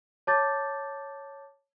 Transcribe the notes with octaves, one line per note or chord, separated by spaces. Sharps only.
C#5 A5 D6 G6 A6